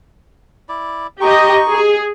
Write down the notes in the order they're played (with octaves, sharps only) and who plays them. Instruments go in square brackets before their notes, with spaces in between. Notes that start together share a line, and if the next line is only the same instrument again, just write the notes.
[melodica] E4 D5
[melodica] D#4 C#6 [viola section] G4 D#5
[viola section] G#4